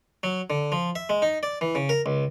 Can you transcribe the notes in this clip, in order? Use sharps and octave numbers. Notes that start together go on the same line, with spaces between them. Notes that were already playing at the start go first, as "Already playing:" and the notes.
F#3
D3
F3
E5
G#3
D#4
D5
E3
C#3
A#4
C#2